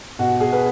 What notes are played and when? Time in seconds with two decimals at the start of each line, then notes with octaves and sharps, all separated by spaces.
0.19 B2 F#4
0.40 G#4
0.52 B4